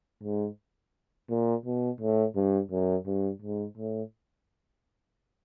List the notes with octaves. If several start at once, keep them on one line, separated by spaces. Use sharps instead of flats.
G#2
A#2
B2
A2
G2
F#2
G2
G#2
A2